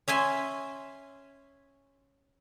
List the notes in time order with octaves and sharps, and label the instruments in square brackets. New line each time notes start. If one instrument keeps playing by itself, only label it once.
[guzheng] C#4 E5 G#5 C6